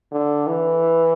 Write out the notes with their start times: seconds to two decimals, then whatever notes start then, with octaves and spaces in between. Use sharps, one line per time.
0.12 D3
0.47 E3